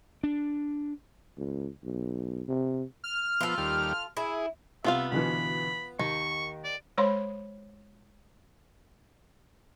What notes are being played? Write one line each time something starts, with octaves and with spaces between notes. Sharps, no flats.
D4
C#2
B1
C3
F6
F3 B3 F4 A4
D#2 G3
E4 G#4
C2 B3 F4 E5 F5
D2 B2 E3 B5
D#2 D#3 C#6
D5
G#3 C5 C#5 B5 C6